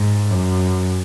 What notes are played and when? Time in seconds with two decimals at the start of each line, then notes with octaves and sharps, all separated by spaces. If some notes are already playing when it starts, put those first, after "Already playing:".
Already playing: G#2
0.30 F#2